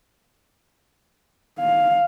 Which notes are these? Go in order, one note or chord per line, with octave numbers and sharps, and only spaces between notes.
F5